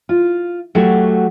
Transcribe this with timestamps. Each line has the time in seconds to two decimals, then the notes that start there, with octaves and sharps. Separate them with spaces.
0.09 F4
0.75 F#3 A3 F#4 G4